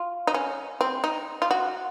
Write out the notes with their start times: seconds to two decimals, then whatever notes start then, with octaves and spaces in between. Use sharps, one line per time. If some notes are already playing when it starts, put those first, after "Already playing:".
Already playing: F4
0.27 D#4
0.34 C#4
0.81 C4
1.04 D#4
1.42 F4
1.51 F#4